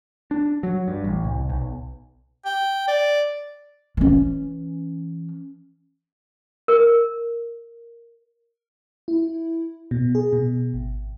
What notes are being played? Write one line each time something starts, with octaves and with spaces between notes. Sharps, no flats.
D4
F#3
G2
A1
C2
B1
G5
D5
E3 C#4
A#4
E4
B2
G#4
B2
G#1